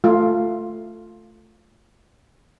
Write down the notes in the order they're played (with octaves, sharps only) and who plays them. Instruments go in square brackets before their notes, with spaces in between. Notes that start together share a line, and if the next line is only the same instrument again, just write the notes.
[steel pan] A3 F4